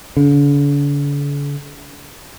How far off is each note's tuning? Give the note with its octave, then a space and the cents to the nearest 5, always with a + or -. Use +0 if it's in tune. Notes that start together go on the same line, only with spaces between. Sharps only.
D3 -45